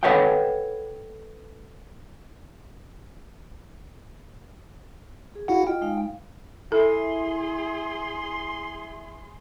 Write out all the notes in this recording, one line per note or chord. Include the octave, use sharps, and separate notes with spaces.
A4 B4 C#5 E5 F#5 G5
G#4
E4 F#4 F5 F#5
F4 D#5 G5
G#3 D#4 F5
E4 G#4 A4 C6